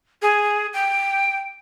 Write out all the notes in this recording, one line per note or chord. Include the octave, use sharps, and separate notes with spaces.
G#4
G5